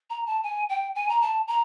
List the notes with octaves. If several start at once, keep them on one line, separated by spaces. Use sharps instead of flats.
A#5
A5
G#5
G5
G#5
A#5
A5
A#5